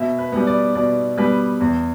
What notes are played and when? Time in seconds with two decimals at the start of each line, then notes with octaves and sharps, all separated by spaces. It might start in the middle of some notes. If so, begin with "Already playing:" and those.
Already playing: B2 E5
0.18 B4
0.32 G3 B3
0.47 D5
0.75 B2 D5
1.18 G3 B3 B4
1.60 E2